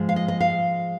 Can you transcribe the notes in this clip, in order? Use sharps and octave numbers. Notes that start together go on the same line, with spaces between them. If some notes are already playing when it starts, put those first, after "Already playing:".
Already playing: G#2 F3 G#3
F5
D#5
D#5
F5